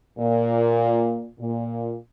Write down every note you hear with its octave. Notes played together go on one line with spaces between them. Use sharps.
A#2
A#2